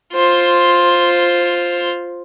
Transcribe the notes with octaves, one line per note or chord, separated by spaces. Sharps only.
F4 C5